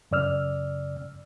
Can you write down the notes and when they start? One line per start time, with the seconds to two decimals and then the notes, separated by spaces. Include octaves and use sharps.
0.11 F#2 C#3 D5 E6 F6